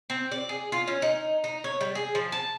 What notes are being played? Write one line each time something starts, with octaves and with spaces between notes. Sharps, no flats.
C4
D5
G#4
F4
C#4
D#4
D#4
C#5
G3
G#4
F3
A5